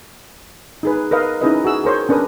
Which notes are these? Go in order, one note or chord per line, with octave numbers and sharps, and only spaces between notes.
D#4 G#4 B4
A#4 B4 D#5 F5
C#4 D#4 E4 G#4 B4 D#5
F#4 G#4 E6
G#4 A#4 C5 C#5
C#4 D4 A#4 B4 D#6